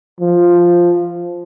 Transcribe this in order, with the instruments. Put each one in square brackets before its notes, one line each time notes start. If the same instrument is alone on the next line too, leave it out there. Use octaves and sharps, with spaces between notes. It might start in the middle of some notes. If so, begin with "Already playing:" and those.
[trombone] F3